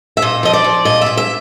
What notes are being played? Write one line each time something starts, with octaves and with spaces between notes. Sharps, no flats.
E5
A#2 D#5
F3 D#5
D5
F3
A#2 D#5
E5
A#2
E5